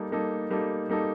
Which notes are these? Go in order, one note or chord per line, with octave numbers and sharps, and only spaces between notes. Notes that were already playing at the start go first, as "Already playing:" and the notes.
Already playing: G3 A#3 D#4 A4
G3 A#3 D#4 A4
G3 A#3 D#4 A4
G3 A#3 D#4 A4